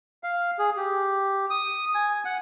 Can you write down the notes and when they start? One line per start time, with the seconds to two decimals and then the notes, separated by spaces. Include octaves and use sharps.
0.23 F5
0.59 G#4
0.77 G4
1.50 D#6
1.95 G#5
2.25 F#5